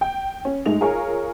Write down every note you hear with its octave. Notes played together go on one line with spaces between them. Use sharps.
G5
C#4
G#2 G#3 A3 D#4 F7
F4 G#4 A#4 C#5